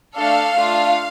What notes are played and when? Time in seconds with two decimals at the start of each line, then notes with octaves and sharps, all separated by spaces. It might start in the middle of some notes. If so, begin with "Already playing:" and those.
0.16 A3 D4 A4 F5
0.55 A3 D4 F4